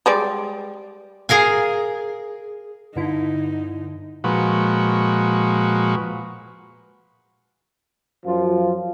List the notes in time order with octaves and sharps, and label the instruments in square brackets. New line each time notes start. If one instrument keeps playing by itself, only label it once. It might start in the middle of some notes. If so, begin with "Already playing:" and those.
[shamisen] G3 G#3 D5
[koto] G#4 A#4 F5 G#5
[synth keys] G2 D3 E4 [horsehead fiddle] D#4
[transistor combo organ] A#2 F3 G#3 F#4 B4 C#6
[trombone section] F#2 F3 F4